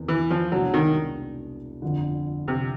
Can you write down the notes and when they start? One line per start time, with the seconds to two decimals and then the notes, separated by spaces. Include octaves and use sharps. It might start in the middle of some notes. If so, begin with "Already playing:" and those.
Already playing: E2 C3 D#3
0.08 E3
0.30 F3
0.52 C2 B2 F#3 G#3 B3 D4
0.74 D#3
1.82 G1 F2 D3
2.48 C3